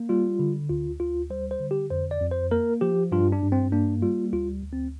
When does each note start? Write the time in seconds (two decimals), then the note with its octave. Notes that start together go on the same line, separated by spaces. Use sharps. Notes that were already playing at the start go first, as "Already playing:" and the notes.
Already playing: A#3
0.09 G3 F4
0.39 D3
0.69 D2 F4
1.00 D2 F4
1.30 G3 C5
1.51 C5
1.60 D3
1.71 G4
1.91 F2 C5
2.11 D5
2.21 F2
2.31 C5
2.51 A#3 A#4
2.81 F3 G4
3.12 G2 F4
3.32 D4
3.42 G2
3.52 C4
3.72 A#3 D4
4.02 G3 F4
4.33 D2 F4
4.63 D2
4.73 C4